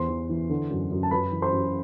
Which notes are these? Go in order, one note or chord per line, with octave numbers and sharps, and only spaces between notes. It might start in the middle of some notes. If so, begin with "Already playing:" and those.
Already playing: E2 C5 C6
E3
E3
D3
F#2
F#2
A5
F#2 B4 B5
E3
C5 C6
F#2